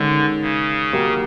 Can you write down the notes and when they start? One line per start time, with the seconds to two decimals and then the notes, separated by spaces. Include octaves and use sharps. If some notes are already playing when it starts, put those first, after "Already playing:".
Already playing: D3 D#3 G#3 C#4
0.41 C#3
0.93 D#3 F#3 A#3 D#4 G4